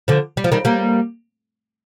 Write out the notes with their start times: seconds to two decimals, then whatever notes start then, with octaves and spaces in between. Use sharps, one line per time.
0.08 D3 F3
0.37 G3
0.44 F3
0.52 D#3 G3
0.65 G3 A#3